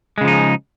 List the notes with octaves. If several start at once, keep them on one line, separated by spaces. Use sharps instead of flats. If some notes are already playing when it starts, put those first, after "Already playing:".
C#3 F3 G#3 D#4